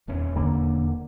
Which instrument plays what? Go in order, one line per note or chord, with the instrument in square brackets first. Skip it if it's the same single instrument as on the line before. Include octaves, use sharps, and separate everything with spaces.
[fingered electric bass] D#1 E2 C#4
[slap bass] D3 A#3